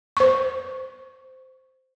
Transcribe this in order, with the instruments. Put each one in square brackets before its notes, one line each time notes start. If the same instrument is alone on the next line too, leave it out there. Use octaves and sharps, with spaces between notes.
[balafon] C5 C#6